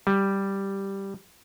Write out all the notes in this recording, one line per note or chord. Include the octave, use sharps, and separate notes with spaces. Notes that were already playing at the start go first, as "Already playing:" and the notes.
G3